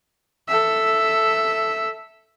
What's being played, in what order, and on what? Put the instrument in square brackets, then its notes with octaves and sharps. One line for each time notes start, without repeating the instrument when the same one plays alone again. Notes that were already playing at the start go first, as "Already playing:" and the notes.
[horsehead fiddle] A4 E5